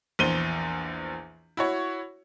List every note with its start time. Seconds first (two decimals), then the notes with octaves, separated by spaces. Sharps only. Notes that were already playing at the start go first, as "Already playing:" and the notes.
0.19 A#1 E2 C5 D#7 G7
1.57 E4 F#4 C#5